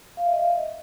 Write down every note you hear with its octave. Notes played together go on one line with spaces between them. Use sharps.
F5
E5
D#5